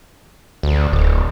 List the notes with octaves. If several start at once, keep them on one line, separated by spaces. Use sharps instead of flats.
D2
D1